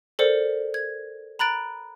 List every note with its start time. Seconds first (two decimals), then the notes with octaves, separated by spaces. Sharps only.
0.19 A4 A#4 C5 D5 C#7
0.74 G#6
1.39 A#5 B5 F#6 A6 D7